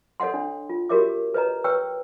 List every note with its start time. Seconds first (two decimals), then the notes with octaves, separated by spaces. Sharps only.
0.20 A4 C#5 D#5 F#5 C6
0.34 D4
0.69 F4
0.89 F#4 G4 A#4 C#5 E5 D6
1.34 B4 C#5 D#5 A#5
1.64 B4 C#5 G5 C#6 E6